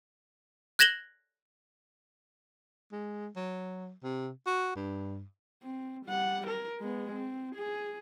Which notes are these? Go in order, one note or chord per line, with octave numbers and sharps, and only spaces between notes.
F#6 G#6 A#6 E7 F#7 G7
G#3
F#3
C3
F#4
G2
C4
G3 F#5
A#4
G#3 B3
C4
G#4